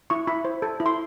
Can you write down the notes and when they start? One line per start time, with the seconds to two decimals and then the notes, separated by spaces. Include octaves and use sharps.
0.10 E4 C#6
0.28 E4 B5
0.45 C5
0.62 A4
0.80 E4
0.86 C6